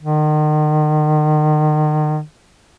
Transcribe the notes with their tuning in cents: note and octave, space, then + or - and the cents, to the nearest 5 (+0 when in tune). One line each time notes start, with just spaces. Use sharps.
D#3 -35